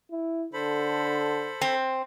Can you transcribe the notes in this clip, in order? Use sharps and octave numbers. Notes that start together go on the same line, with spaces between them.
E4
D3 A4 C5 B5
C4